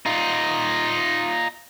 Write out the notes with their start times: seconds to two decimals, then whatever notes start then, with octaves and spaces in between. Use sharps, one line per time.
0.06 D#4 F4